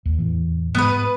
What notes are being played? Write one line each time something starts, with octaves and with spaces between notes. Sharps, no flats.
D#2
E2 A2 E3
G#2 G#3 B3 B4